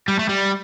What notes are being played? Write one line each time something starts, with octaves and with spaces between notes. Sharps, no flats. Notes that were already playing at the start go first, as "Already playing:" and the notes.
G3
A3
G3